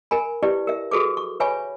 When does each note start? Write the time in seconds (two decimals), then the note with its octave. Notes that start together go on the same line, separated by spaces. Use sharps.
0.11 A#4 G#5 B5
0.43 E4 G4 B4 D5
0.67 A#4 E5
0.91 F#4 G#4 A4 B4 D6
1.17 C#6
1.40 B4 C#5 E5 G#5 B5 C#6